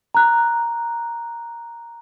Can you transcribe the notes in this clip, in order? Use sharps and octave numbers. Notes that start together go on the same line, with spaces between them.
A#5 F#6